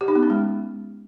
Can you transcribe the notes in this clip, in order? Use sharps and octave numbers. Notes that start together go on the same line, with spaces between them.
G4
D#4
B3
C#4
G#3